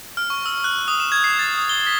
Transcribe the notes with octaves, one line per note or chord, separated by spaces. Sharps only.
F6
C#6
E6
F#6
D#6
E7
G#6
C7
A6
D#6
G7
B6